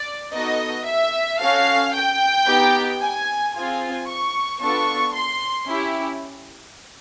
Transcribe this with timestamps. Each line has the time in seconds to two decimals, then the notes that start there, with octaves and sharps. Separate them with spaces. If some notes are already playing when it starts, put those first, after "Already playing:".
Already playing: D5
0.34 B3 D#4 F#4 A4 D#5
0.87 E5
1.41 C#4 F#4 A4 F5
1.94 G5
2.47 B3 D#4 G4
3.00 G#5
3.54 C4 F4 G#4 G#5
4.08 C#6
4.60 B3 D4 F4 A4 C#6
5.14 C6
5.67 C#4 E4 G4